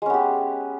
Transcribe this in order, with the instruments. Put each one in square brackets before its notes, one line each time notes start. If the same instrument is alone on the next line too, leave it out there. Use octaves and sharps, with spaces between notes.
[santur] G#3
C#4
B3
G4